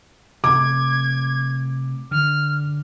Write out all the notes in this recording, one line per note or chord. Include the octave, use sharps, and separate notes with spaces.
C3 A3 D6 G#6
D3 F6